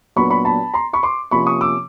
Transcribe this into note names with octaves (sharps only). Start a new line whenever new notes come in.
A#2 F#3 B3 D4 B5 C#6
B5 C#6
A5 B5
A#5 C6
B5 C#6
C6 D6
C3 F3 A#3 C#4 B5 C#6
C#6 D#6
D6 E6